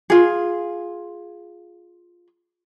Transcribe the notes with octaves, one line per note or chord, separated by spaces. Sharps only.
F4 G#4